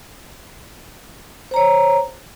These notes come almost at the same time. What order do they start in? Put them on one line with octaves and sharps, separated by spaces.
C5 A#5 C#5